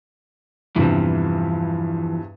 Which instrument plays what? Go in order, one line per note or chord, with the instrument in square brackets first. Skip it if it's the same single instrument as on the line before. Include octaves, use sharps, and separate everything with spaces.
[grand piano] E2 G2 C3 [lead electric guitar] E3 F3